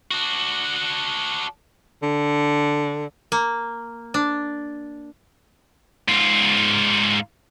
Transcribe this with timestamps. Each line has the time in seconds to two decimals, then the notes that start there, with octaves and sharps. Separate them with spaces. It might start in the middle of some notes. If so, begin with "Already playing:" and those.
0.11 D4 F#4
2.03 D3
3.32 A#3
4.14 D4
6.08 G#2 F4